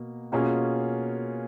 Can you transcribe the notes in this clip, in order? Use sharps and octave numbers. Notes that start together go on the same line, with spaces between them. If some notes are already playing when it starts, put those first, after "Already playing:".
Already playing: B2 A#3
B2 A#3 C#4 F4 G#4